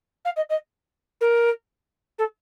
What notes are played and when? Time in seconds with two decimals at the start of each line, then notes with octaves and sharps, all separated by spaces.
0.25 F5
0.36 D#5
0.49 D#5
1.21 A#4
2.18 A4